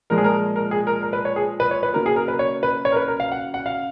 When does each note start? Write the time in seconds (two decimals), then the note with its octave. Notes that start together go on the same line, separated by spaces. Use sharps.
0.10 A#2 F3 G#3 A#4
0.18 G#4
0.24 A#4
0.56 A#4
0.71 G#4
0.87 A#4
1.02 A#4
1.13 B4
1.25 C#5
1.36 G#4
1.60 B4
1.71 C#5
1.83 B4
1.94 C#3 F#3 A#3 A#4
2.06 G#4
2.16 A#4
2.28 B4
2.39 C#5
2.63 B4
2.85 C#5
2.92 A#4
2.96 B4
3.08 A#4
3.20 F5
3.32 F#5
3.54 F#5
3.66 F5